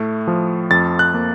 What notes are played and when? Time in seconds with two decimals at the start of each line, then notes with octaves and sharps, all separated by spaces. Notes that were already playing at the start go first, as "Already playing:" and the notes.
Already playing: A2 A3
0.27 F3
0.71 F2 A6
0.99 F#6
1.14 A#3